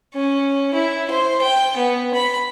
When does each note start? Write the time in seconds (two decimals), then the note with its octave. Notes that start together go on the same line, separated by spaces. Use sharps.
0.14 C#4
0.74 E4
1.10 C5
1.42 G5
1.77 B3
2.14 B5